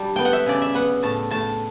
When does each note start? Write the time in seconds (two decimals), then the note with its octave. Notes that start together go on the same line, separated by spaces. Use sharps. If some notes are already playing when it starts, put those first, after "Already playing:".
Already playing: G3 D4 A5
0.16 B3 G5
0.25 F#5
0.33 E5
0.46 C#3 D5
0.62 E5
0.74 B3 F#5
1.03 A2 A5
1.31 A2 A5